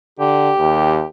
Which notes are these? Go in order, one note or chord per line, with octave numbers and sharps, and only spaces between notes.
D3 G4
D#2